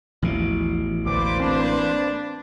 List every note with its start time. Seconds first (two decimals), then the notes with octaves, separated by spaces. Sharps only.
0.22 A1 D#2 B2 E3 F3
1.06 G#1 D2 A#3 B4 C5 D5 D6
1.40 C4 D4